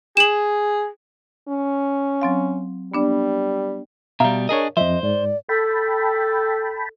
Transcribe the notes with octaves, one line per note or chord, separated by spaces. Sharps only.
G#4 E7 F#7
C#4
F#3 C4 F5
G3 B3 D4 D5
B2 G3 E5 F5 A#5
D4 G#4 A#4 C#5 D#5
F2 F3 C5 D#5 E5
G#2 D5
A4 G5 A5 B5